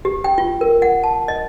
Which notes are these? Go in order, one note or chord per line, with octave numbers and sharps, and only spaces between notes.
G4
G5
F4
A#4
F#5
A5
D#5